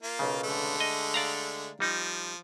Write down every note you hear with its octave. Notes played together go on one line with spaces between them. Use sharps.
A#3 F4
B1 C#3
D3 G#3 A3
D#5
D5 F5 A#5
F3 G3 D#4